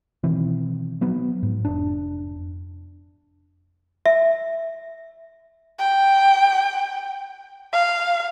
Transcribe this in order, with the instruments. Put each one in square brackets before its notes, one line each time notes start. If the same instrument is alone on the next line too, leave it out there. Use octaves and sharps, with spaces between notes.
[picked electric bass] B2 D#3 E3 C4
F3 F#3 B3
G#2
F1 D4
[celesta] E5
[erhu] G5
F5